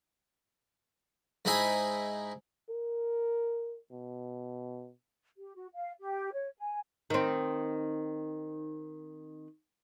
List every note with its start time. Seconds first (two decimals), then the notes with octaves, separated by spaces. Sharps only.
1.45 G#2 D#4 E4 G#4 G#5 B5
2.69 A#4
3.91 B2
5.38 G4
5.55 F#4
5.74 F5
6.00 G4
6.33 C#5
6.58 G#5
7.10 D#3 C4